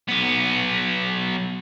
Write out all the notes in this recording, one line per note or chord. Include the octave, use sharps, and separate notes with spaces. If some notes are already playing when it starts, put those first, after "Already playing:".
B1 B3